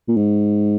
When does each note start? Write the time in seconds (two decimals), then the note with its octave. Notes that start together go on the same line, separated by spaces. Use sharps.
0.08 A#2
0.17 G#2